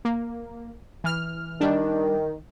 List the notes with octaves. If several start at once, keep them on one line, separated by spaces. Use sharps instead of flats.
A#3
E3 F6
D#3 G3 D4